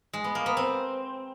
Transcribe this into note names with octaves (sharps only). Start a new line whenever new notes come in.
G#3
B3
A#3
B3
C4